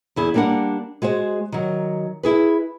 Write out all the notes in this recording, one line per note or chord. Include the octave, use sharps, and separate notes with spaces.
E2 E4 G#4
G3 A#3 D4 A#4 F#5
G#3 F#4 G#4 C5
D#3 F#3
E4 G#4 B4